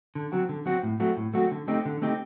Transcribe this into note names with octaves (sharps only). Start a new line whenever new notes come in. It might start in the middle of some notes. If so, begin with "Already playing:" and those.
D3
F#3 C4 F#4
D3
F#3 C4 F#4
A2
F#3 A3 C4 F#4
A2
F#3 A3 C4 F#4
D3
A3 C4 D#4 G4
D3
A3 C4 D#4 G4